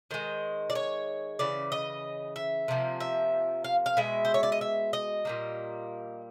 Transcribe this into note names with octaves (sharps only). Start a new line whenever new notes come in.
D#3 G#3 C5
D5
C#5
C#3 E3 D5
D#5
E5
C3 F3 A#3
E5
F5
F5
B2 G#3 E5
C5
C#5
D5
D#5
E5
D#5
A#2 G3 A#3